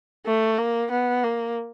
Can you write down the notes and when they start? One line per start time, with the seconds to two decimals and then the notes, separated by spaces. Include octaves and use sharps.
0.26 A3
0.58 A#3
0.91 B3
1.24 A#3